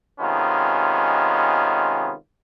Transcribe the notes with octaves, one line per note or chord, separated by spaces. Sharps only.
C3 D#3 G#3 B3 C#4 F4